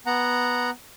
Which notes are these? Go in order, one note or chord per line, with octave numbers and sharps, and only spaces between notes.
B3 F#5 A#5